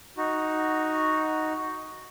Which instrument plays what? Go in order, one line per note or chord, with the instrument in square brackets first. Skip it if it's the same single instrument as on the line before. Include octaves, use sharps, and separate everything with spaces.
[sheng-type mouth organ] D#4 F#4